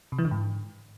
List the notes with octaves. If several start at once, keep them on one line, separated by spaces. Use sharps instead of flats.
C3
E3
D3
G#2